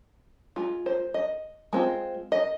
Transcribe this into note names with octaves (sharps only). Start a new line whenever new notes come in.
G#3 F4
C5
D#5
G#3 C4 F4
D#5